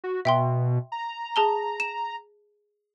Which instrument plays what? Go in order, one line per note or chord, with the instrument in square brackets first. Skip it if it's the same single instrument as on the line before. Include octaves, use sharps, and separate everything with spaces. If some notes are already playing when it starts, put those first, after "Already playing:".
[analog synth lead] F#4
[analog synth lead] B2 [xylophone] E5 G5 C6
[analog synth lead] A#5
[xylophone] G#4 A5 G7
E7